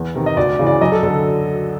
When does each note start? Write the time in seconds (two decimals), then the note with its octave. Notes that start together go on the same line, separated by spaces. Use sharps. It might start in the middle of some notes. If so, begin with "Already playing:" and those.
Already playing: E2
0.15 C3 D#3
0.26 D#5
0.37 D2 D5
0.59 C#3 E3
0.66 D5
0.81 F#2 D#5
0.92 A4
1.03 D3 A4